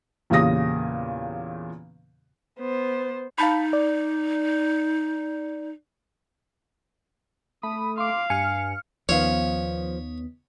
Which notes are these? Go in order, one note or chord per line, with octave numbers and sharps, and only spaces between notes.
E2 A#2 C#3 G4 D#6 A#6
B3 C5
D#4 F5 A5 B5
D5
A3 B5 D#6
F5 C6 D6
G2 G#5 F6 C#7
D#2 D#3 F3 B3 C#4 C#5 F5